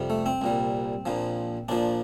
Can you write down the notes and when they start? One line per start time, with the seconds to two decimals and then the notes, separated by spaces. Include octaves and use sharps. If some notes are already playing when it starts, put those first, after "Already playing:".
Already playing: F2 C3 G3
0.10 A3
0.26 C4
0.41 C2 A#2 G3
1.06 A#1 A#2 F3
1.69 A#1 A#2 F3 D4